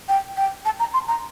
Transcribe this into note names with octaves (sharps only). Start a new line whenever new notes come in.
G5
G5
A5
A#5
C6
A#5